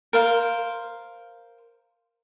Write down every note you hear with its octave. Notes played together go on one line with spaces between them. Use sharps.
A#4 C5 F5